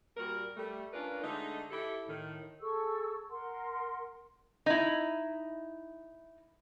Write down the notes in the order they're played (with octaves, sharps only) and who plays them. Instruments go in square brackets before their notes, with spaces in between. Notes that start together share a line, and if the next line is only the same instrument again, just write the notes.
[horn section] A#2 G3 F#4 A#4
G3 A3
C#4 D4 F4 A#4 B4 D5
D3 G#3 A3 D#4
E4 G4 A4
A2 D#3
[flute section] G#4 A4 C#6 E6
A#4 F#5 C6
[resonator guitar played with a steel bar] D#4 E4